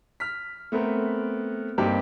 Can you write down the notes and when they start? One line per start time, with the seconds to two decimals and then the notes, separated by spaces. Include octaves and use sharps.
0.20 F6 B6
0.72 A3 B3 C4 A#4
1.78 G2 A#3 C4 D#4 G4